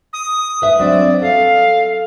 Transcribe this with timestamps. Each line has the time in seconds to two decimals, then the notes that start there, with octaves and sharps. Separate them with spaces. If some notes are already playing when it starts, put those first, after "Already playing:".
0.13 D#6
0.62 B4 E5
0.79 F#3 C4 D4 D5
1.22 A4 F5